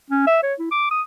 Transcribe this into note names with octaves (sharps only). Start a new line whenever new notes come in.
C#4
E5
C#5
E4
D6
D#6